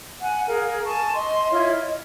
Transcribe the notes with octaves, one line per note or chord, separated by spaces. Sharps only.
F#5 G#5
G#4 A#4 F5
G#5 A5 C#6
D#5 C6
E4 F4 C#5 D#5
D#5